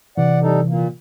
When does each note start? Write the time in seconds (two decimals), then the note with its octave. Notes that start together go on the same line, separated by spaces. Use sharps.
0.18 C3 E3 D5 F#5
0.42 G3 D#4 A4
0.69 A#2 A#3